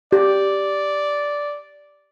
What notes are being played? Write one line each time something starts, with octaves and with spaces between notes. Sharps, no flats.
G4 D5